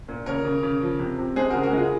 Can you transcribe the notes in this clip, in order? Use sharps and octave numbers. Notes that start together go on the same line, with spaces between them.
A#2
C#3 A#4 C#5
C#3
C#3
F3
C3
C3
G#3 G#4 C5
C#3 F#4 A#4
F#4 A#4
G#3 F4 G#4